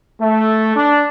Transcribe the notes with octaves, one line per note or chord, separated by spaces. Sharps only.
A3
D4